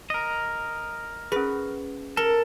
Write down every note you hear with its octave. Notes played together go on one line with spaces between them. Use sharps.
A#4 D#5
C#4 G#4 B4
A4 A#4